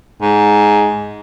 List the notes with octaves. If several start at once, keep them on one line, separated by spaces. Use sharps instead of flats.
G#2